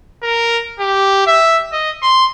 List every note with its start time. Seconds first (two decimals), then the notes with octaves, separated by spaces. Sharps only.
0.23 A#4
0.80 G4
1.27 E5
1.72 D#5
2.02 C6